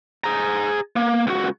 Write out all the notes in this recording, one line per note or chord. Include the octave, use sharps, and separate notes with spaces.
G#4 A#5
A#3
C#2 F#4